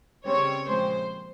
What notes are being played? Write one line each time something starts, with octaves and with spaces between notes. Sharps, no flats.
C#3 G3 C4 C#5
A#2 F3 G#3 C4 C5